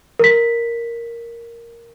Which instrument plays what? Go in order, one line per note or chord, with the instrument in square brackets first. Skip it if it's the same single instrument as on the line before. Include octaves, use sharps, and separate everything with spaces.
[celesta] A#4 B6